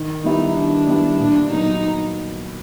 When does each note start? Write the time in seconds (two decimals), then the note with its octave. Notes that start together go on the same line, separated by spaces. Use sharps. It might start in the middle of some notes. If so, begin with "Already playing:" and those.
Already playing: D#3
0.23 G3 B3 D#4 E4 G4
0.55 D#3 D4
0.87 G3 B3 E4 G4
1.19 A#2 D4
1.50 F#3 B3 D#4